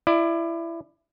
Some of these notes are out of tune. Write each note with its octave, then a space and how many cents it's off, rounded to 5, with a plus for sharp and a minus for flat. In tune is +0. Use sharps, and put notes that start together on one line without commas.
E4 +20 D5 +30